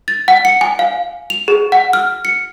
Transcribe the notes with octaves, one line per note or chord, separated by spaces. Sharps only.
A6
F#5
C#7
G#5
F5
F7
G#4
F#5
F6
C#7